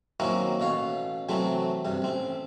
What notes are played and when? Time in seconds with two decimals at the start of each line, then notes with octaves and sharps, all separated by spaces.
0.20 D#3 F#3 A#3 C4 C#4 E4
0.60 A1 B2 C#5 F5
1.29 C3 E3 F#3 A3 C4
1.85 G2 C3
2.02 A1 C4